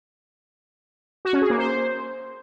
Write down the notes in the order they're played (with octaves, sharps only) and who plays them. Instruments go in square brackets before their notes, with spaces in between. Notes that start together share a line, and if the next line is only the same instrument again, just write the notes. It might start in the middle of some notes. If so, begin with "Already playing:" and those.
[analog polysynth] F#4
C#4
G#4
A#3
C5